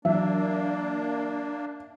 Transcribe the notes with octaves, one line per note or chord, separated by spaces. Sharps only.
E3 F#3 A#3 D4 E5